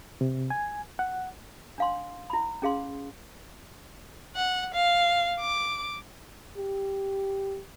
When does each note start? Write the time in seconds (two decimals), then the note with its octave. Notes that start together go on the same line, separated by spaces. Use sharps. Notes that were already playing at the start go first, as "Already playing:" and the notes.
0.21 C3
0.50 G#5
0.99 F#5
1.78 D4 F5 C6
2.30 E4 B5
2.62 C#4 G#4 F5 C6
4.36 F#5
4.74 F5
5.40 D6
6.58 G4